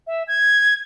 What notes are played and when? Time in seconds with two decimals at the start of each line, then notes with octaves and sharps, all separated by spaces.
0.07 E5
0.28 G#6